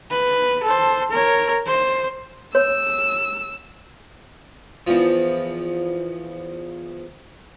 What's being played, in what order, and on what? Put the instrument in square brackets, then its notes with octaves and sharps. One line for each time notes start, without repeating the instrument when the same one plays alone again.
[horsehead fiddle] B4
A4 C5
A#4 C#5
C5
[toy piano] C#5 [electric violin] E6
[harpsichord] E2 F3